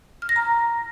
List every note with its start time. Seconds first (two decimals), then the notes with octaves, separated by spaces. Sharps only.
0.22 F6
0.29 A#6
0.36 A#5